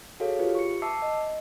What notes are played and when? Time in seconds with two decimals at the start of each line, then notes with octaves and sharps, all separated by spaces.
0.20 F#4 G#4 A4 C#5 F5
0.39 F4 G4 B4
0.55 C#6 C#7
0.82 E5 A5 D6 E6 C7
1.02 D#5